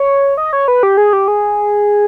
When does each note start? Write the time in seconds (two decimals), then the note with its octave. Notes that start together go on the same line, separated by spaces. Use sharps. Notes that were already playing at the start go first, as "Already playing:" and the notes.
Already playing: C#5
0.37 D#5
0.53 C#5
0.68 B4
0.83 G4
0.97 G#4
1.13 G4
1.28 G#4